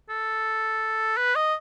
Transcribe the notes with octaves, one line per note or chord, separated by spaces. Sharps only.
A4
B4
D#5